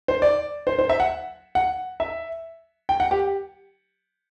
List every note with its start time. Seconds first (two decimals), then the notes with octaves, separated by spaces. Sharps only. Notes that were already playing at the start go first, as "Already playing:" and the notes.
0.08 C5
0.22 D5
0.67 C5
0.79 C5
0.89 E5
1.00 F#5
1.55 F#5
2.00 E5
2.89 G5
3.00 F#5
3.11 G4